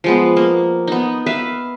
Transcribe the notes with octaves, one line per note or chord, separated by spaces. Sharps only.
F3 G#3 B3
A#3
B3 D#4
B4 E5 F5